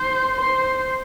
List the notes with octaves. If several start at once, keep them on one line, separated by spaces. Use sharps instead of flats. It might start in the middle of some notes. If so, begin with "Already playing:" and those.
Already playing: C5
C5